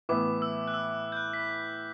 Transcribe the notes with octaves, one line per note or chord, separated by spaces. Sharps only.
A2 E3 B3 E4 D6
E6
F#6
E6
G6
F#6
B6